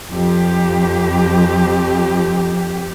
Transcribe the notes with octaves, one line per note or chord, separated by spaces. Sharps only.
F2 G4